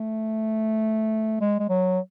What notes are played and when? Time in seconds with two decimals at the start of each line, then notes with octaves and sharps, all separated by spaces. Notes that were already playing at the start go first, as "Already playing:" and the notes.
Already playing: A3
1.41 G#3
1.60 G#3
1.69 F#3